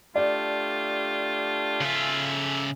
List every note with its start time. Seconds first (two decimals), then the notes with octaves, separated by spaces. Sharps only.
0.15 A3 D4 F4 G4 D5
1.81 C#3 A4 E5 G#5 E6